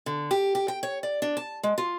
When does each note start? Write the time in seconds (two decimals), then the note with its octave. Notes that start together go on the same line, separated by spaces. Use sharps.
0.06 D3
0.31 G4
0.55 G4
0.68 G5
0.83 C#5
1.03 D5
1.22 D4
1.37 A5
1.63 G#3
1.78 F4